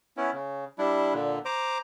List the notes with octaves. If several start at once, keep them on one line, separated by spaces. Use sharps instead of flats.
B3 C#4 E4
C#3
G3 D4 E4
A#2 D3
C5 A#5 D6